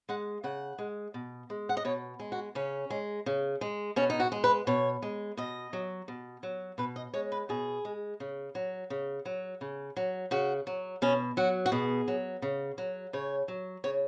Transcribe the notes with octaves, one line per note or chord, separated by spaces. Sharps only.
G#3 F#5
C#3 F#5
G#3
B2
G#3
F#5
D#5
B2 C#5
G#3
F#4
C#3 C#4
G#3
C#3
G#3
B2 C#4
D#4
F#4
G#3
B4
B2 C#5
G#3
B2 D#5
F#3
B2
F#3
B2 B4
D#5
G#3 C#5
B4
B2 G#4
G#3
C#3
F#3
C#3
F#3
C#3
F#3
C#3 F#4
F#3
B2 C#4
F#3 F#4
F#4
B2 G#4
F#3
C#3
F#3
C#3 C#5
F#3
C#3 C#5